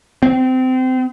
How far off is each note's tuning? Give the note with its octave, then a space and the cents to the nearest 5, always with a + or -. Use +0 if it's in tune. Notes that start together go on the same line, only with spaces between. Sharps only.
C4 -25